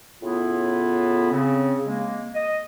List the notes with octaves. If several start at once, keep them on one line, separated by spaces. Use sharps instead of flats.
A2 C#3 B3 E4 F4
C#3 C4
G#3 A#3
D#5